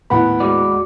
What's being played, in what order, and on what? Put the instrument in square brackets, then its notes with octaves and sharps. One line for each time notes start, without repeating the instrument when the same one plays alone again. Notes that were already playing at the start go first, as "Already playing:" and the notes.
[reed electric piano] D#2 F#5 B5 [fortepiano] A2 B3
[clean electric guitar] G#3 F#4 D5